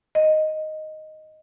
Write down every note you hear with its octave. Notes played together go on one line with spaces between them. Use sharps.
D#5